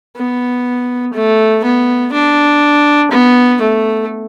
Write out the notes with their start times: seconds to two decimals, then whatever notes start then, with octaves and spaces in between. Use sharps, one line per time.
0.16 B3
1.14 A3
1.64 B3
2.12 D4
3.12 B3
3.61 A3